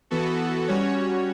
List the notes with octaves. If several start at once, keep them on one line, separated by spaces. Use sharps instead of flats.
E3 B3 F#4 A4
G3 C#4 F#4 C#5